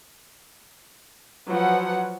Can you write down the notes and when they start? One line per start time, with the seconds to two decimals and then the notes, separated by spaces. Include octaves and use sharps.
1.48 F3 F#3 B4 F#5